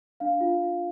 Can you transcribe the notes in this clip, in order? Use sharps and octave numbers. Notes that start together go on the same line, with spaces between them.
D4 F5
F4